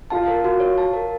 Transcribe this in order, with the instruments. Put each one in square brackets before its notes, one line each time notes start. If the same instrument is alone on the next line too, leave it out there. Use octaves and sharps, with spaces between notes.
[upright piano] F4 [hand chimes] A5
[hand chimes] A#4
F#4
C#5
A5
A#4